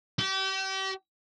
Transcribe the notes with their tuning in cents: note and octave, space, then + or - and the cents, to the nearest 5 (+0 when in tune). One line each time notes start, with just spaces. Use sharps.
G4 -35